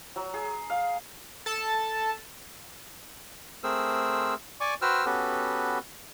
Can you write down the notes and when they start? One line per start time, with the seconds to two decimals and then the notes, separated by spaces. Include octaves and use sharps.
0.16 F#3
0.34 G#4
0.70 F5
1.46 A4 A5
3.64 A3 C4 G#4 A#4 C5 E6
4.60 D5 G#5 C#6 D6
4.82 F#4 B4 C5 G5 E6 F6
5.05 B3 C#4 F#4 G4 A4 B4